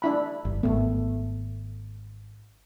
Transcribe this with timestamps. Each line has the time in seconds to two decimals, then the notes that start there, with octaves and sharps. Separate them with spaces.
0.02 D4 E4 B5
0.45 G1
0.63 G#1 D#2 A3 B3